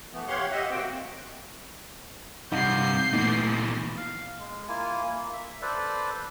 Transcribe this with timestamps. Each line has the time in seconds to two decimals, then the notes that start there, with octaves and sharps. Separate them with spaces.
0.13 E3 A3 B3
0.28 G4 C#5 F5 F#5 C6
0.51 G4 D#5 E5 F#5
0.71 D#2 A#3 C4 F#4 C5 G5
2.52 G2 C3 D#4 F5 F#5 G6 C7
3.13 A#2 E3 A3 B3 D#4
3.97 F5
4.39 G#3
4.68 A#3 E4 F4 G#5
5.03 A#3
5.33 E5
5.62 A4 B4 C5 D5